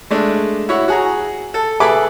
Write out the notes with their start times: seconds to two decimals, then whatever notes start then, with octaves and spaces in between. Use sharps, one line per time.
0.10 G#3 A3 D4
0.69 E4 F#4 C#5
0.88 F#4 G#4 A#5
1.54 A4
1.80 G#4 A4 B4 E5 B5 D6